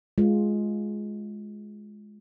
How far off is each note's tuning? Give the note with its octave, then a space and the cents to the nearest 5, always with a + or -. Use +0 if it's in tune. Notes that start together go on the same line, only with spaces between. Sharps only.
G#3 +10 F4 +0